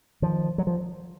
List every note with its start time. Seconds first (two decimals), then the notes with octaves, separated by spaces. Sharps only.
0.22 D#3 F3
0.58 F#3
0.67 F3